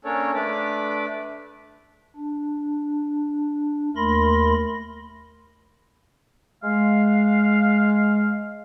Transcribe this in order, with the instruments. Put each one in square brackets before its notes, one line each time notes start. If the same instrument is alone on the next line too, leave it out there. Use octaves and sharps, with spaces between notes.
[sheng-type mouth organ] A#3 C#4 D4 A4 C#5
A3 D4 B4 D6
[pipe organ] D4
D#2 A3 A#4 B5 C6 A#6
[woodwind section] G#3 F5